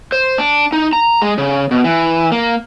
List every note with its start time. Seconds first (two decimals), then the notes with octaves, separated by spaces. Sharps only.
0.12 C5
0.38 D4
0.72 D#4
0.93 A#5
1.22 G#3
1.38 C#3
1.71 B2
1.84 E3
2.32 A#3